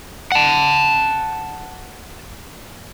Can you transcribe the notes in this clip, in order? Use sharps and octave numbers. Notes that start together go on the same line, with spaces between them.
F#5 A5